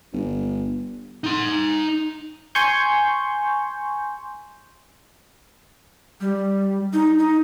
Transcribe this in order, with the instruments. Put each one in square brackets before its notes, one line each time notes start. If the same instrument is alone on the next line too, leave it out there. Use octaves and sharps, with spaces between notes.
[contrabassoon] G1
[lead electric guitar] D#4 C6
[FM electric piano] G#5 C6 C#6 G6
[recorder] G3
D#4
D#4